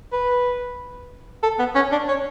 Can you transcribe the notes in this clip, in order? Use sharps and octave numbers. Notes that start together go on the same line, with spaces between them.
B4
A4
B3
C#4
D4
C#5